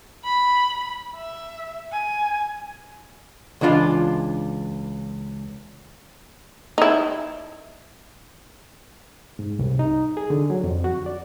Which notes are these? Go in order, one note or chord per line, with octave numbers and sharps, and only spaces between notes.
B5
E5
G#5
C#2 E3 D4 F4
D#4 E4
G#2
C2
D#4
G#4
D3
F#3
F2
F#4
D5